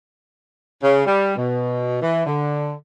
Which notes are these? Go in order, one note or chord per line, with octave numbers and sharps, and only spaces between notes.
C#3
G3
B2
E3
D3